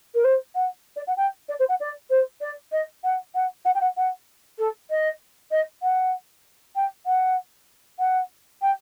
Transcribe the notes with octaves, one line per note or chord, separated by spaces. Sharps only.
A#4
C5
F#5
D5
F#5
G5
D5
C5
F#5
D5
C5
D5
D#5
F#5
F#5
F#5
G5
F#5
F#5
A4
D#5
D#5
F#5
G5
F#5
F#5
G5